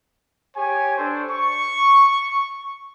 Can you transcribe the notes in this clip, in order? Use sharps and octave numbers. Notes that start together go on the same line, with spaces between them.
G4 C#5 G#5
D4 A4 C5
C#6